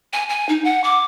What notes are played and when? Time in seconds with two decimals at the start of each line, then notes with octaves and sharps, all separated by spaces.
0.13 G#5
0.29 G#5
0.49 D#4
0.64 F#5
0.84 D6